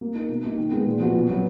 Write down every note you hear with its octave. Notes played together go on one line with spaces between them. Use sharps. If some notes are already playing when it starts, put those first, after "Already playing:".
A#3
D#4 A#4
B2
A#3 D#4
D#3
G#3 B3
A#2
F3 B3 F#4
B2
F#3 B3